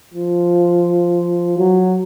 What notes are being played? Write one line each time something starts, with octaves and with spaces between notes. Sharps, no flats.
F3
F#3